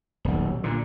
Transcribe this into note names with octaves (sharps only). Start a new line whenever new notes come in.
D#1 B1
A#2 D3